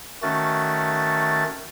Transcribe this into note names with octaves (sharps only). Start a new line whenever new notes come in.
D#3 A3 C#4 F#4 A6